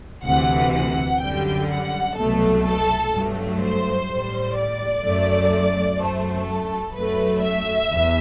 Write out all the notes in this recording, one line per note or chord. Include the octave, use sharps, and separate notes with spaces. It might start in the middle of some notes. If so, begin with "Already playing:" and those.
D2 C3 E3 F#5
F#5
F#2 D3 G3 G5
F#5
C2 B2 F#3 A3 A4
A4
G2 F#3 A3
C5
A2 G3
D5
F#2 F#3 A3
F#2 F#3 A3 C5
A4
F#2 F#3 A3 B4
E5
E2